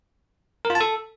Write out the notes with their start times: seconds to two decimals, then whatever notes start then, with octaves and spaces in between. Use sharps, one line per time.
0.65 A#4
0.70 F4
0.75 A5
0.80 A4